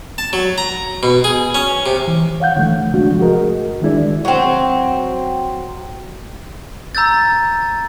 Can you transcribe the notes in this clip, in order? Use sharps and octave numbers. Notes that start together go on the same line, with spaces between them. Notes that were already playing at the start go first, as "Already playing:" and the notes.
A5
F#3
A#5
B2
G#4
C#4
C3
E3
C#5 F5 F#5 G6
D3 E3 F3 A3
C3 F3 G#3 A3 D4 F#4
F#4 G#4 A#4 D#5
D#3 G#3 D4 E4 G#4 D5
F#3 C4
A#5 E6 G6 A6